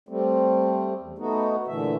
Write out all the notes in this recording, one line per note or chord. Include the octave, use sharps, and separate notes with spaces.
G3 A3 C4
E2
A3 B3 D#4 F#4
A#2 D3 E3 A3 E5